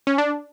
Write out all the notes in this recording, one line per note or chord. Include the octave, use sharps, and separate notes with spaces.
C#4
D4